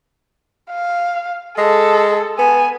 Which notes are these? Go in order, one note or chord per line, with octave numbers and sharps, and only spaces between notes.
F5
G#3 A4
B3 G#5